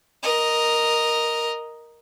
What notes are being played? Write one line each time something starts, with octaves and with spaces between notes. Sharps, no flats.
A#4 D#5